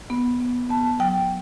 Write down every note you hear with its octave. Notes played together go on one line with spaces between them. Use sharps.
B3
B3
B3 A5
F#3 G5